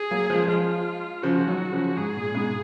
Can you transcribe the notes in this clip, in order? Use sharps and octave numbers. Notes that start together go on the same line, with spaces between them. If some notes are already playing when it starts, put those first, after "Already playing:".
Already playing: G#4
F#3 A#3
F3 G#3
F3 G#3 F4
C#3 F3 F#4
D#3 F#3
C#3 F3
G#2 G#4
A#2
G#2 B2